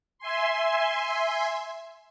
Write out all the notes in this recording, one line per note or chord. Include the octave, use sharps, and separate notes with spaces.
E5 G#5 C6